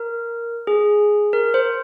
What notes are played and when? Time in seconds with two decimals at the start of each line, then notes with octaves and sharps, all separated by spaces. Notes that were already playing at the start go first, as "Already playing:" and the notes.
Already playing: A#4
0.67 G#4
1.33 A#4
1.54 C5